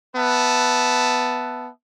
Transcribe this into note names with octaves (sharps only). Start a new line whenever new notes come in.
B3 B4 E5 A5